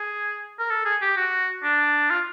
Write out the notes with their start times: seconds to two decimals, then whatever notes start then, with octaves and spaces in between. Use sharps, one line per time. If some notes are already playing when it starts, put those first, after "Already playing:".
Already playing: G#4
0.59 A#4
0.70 A4
0.85 G#4
1.01 G4
1.17 F#4
1.63 D4
2.10 F4